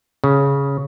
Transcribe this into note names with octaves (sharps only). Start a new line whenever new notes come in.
C#3